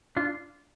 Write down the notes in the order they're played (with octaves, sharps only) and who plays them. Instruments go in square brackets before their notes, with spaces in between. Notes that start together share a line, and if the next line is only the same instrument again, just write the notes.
[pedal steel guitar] D4 F4